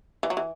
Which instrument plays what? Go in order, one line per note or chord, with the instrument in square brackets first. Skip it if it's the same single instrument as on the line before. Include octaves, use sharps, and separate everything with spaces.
[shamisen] E3
F#3
E3